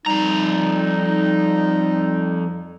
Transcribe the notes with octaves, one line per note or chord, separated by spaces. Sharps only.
F2 G3 D#4 A#5